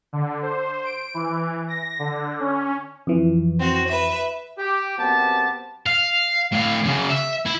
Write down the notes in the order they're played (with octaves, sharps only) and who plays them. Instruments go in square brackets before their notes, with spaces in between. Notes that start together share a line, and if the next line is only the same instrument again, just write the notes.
[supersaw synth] D3
C5
D7
E3
A#6
D3
C#4
[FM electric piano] F2 E3
[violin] C4 F#4
B4 E5
[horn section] G4
F#2 B3 C4 G4 A5
[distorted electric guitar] F5
A2 F5
F#2 C#3
E5
E4